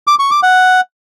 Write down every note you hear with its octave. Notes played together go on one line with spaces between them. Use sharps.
D6
C#6
D6
F#5